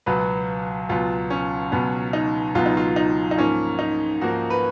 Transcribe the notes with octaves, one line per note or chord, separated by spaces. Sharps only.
C#2 B2 F#3 B3 B4
C#2 B2 F#3 B3 F4
C#4
C#2 B2 F#3 B3 C#4
D#4
C#2 B2 F#3 B3 F4
D#4
F4
F4
D#4
D#4
G#2 F3 A#3 C#4
D#4
G#2 F3 A#3 F#4
B4